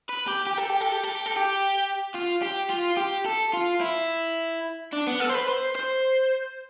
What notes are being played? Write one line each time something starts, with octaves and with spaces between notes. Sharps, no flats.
B4
G4
G4
A4
G4
A4
G4
A4
G4
A4
G4
F4
G4
F4
G4
A4
F4
E4
D4
B3
A4
C5
B4
C5
C5